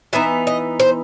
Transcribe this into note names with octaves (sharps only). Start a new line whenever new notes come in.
E3 B3 D#4 E5
D#5
C5